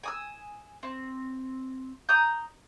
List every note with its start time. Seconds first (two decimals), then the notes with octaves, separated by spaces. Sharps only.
0.03 G#5 D#6 E6
0.83 C4
2.09 A#5 D#6 G6